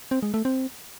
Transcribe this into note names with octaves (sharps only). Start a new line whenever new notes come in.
C4
G#3
A3
C4